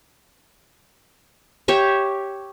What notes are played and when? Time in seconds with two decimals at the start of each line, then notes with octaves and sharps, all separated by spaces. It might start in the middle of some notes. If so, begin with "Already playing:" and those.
1.68 G4 C#5 E5